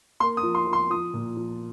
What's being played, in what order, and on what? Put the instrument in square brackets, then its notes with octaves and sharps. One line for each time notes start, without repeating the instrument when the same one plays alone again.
[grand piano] A#3 C6
D#6
F3
C6
F3
C6
F3 D#6
A#2
F3